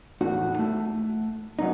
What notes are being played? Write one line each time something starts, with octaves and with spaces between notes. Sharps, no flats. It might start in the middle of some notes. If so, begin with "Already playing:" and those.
E2 A2 D#4 F#4 F#5
A3
F#2 B2 D#4